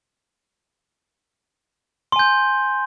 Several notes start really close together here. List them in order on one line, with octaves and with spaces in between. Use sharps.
C6 G#5 G6